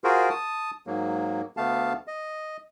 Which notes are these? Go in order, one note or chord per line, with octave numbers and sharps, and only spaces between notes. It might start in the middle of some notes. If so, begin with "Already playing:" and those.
F4 F#4 G#4 A#4 C5
A5 D#6
G#2 F#3 A#3
D2 A3 B3 F5 A5
D#5